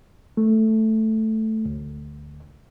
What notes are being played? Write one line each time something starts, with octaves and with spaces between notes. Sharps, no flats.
A3
D2